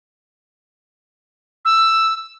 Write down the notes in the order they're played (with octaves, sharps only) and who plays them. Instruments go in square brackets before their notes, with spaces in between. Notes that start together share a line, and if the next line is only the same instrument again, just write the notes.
[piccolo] E6